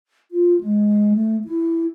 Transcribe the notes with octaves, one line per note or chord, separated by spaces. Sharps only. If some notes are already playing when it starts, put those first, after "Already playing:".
F4
G#3
A3
E4